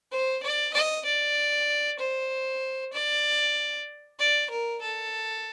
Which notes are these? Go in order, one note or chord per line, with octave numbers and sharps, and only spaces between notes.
C5
D5
D#5
D5
C5
D5
D5
A#4
A4